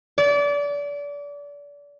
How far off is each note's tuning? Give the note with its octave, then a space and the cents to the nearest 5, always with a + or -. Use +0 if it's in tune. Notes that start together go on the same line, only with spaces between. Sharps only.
D5 -30